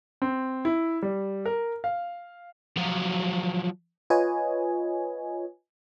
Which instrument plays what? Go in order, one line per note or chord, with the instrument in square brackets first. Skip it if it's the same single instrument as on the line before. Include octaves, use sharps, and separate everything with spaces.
[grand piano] C4
E4
G3
A#4
F5
[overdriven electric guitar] F3 F#3
[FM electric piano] F4 B4 C#5 D#5 G#5